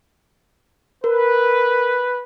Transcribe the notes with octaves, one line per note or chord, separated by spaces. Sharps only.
A#4 B4